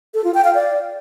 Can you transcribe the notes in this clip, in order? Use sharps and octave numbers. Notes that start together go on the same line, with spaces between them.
A4
F4
G5
F5
D5